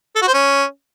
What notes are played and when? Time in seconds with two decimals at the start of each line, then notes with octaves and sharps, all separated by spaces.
0.16 A4
0.22 F#4
0.28 C5
0.34 C#4